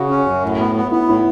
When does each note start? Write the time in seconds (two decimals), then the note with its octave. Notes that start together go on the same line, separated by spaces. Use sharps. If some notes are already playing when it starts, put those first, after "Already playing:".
Already playing: C#3 F#4
0.10 C#4
0.26 F#2
0.43 A2
0.59 B3
0.76 B3
0.91 B3 E4
1.09 A2 E4